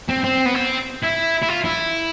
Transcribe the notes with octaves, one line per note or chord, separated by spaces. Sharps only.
C4
C4
B3
C4
E4
E4
F4
E4